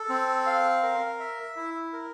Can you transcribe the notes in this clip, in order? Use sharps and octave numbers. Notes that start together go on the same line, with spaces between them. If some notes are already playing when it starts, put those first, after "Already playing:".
Already playing: A4
C4
F5
A#4
E5
E4
A#4